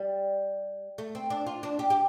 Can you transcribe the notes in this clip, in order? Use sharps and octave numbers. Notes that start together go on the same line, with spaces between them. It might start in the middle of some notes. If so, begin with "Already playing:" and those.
Already playing: G3
A3
C4
D4
F4
D4
G4
G4